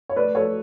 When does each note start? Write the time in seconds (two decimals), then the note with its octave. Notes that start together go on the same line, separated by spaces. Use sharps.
0.09 C#5
0.16 A3 B4 D5
0.35 A3 A4 C#5